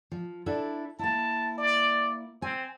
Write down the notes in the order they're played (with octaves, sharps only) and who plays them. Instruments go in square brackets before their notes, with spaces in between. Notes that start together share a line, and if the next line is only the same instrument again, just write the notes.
[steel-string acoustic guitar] F3
D4 E4 A4
[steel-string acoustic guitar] A#3 E4 [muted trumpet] A5
[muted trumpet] D5
[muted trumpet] C4 [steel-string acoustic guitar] G#5